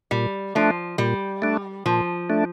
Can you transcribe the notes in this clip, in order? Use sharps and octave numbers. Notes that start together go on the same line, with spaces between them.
A#2 G3
F3 A3 D4
A#2 G3
A3 D4
A#2 F3
A3 D4